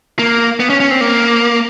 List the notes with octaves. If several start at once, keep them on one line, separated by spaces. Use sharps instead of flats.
A#3
B3
C#4
C#4
C4
A#3